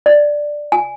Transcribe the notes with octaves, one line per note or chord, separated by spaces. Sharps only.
D5
G#5